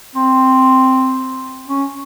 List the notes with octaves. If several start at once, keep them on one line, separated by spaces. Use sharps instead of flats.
C4
C#4